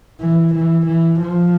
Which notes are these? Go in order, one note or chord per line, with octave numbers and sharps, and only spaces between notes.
E3
E3
E3
F3